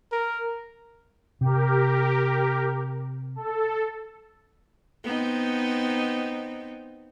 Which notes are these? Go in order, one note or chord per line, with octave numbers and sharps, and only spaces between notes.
A#4
C3 G4 A#4
A4
B3 C4 D#4